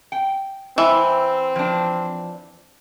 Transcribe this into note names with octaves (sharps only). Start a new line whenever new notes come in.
G5
E3 C4
F3 D4